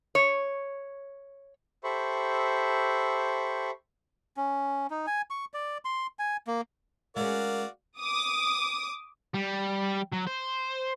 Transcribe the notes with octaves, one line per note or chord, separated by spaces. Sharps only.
C#5
G4 A4 C5 E5 B5 C#6
C#4
D#4
G#5
C#6
D5
C6
G#5
A#3
G#3 C#4 F#4 A#4 D5 F5
D6 D#6
G3
F#3
C5